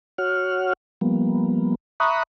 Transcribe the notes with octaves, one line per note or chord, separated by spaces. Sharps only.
F#4 C#5 F#5 F6
F3 G3 A#3 B3
E5 A#5 B5 C#6 D#6 F#6